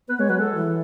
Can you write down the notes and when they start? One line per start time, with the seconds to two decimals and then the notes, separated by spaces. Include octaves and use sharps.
0.09 B3 B4
0.19 G#3 C#5
0.29 F#3 B4
0.39 G#3 A4
0.55 E3